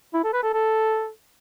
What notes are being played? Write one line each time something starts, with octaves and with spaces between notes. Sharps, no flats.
E4
A4
B4
A4
A4